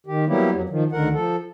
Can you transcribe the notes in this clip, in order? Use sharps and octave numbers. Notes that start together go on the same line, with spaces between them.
D#3 G4
F#3 G3 A#3 B3 E4 G4
F2 F#3
D#3 F3
D2 D3 D#3 A#4 F#5
F3 A4